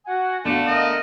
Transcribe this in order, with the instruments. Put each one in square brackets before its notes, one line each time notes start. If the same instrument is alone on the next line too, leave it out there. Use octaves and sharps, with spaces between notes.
[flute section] F#4 F#5 G#5
[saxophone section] D3 A3 [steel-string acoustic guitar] B3 F5 [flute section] D4 F#4
[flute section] A#4 [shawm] D#5